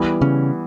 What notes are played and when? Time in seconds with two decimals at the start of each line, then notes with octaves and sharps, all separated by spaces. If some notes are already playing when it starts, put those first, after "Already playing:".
Already playing: E3 G3 B3 E4
0.21 C#3 C#4